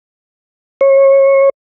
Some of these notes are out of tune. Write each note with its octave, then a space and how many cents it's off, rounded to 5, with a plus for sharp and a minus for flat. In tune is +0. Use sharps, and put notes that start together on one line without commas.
C#5 -25